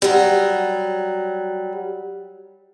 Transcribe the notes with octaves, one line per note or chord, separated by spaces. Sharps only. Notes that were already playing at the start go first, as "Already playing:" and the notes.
F#3 G3